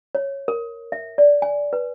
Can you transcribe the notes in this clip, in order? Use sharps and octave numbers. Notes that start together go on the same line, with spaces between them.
C#5
A#4
E5
D5
G#5
B4